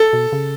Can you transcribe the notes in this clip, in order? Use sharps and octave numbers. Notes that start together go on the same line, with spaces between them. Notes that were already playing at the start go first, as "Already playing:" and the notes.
Already playing: A4
B2
C#3